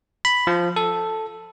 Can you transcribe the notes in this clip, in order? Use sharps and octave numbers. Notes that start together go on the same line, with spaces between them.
B5
F3
A4